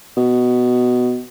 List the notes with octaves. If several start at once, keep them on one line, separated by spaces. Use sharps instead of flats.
B2